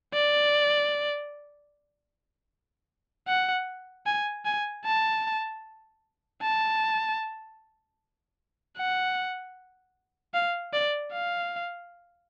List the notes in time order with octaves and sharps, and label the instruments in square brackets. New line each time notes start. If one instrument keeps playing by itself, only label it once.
[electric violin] D5
F#5
G#5
G#5
A5
A5
F#5
F5
D5
F5